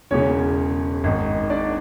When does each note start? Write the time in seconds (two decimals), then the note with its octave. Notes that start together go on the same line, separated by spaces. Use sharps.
0.11 E1 E2 C#3 C#4 C#5
1.04 G#1 G#2 D#3
1.50 D4 D5